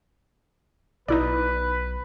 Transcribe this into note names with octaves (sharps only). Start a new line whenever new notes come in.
B1 D#4 E4 B4 D5